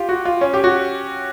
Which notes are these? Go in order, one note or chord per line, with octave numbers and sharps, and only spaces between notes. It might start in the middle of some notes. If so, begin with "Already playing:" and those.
Already playing: F4 G4
F#4
F4
C#4
G4
F#4